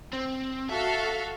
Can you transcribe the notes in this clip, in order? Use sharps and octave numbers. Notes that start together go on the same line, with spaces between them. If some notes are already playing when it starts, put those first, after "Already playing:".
C4
F#4 A4 E5 F5